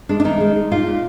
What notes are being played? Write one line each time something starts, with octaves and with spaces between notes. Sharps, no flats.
G#3 D4
D4
D#3 D#4
G#3
G#3
A#2 F4
A#2